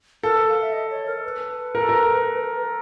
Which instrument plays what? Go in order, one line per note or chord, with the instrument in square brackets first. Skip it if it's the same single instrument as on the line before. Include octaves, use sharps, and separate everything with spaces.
[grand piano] A4 [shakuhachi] A#4
[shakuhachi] B4
F5
E5
D#5
C#5
A#4
B4
[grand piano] A#4
A4
A#4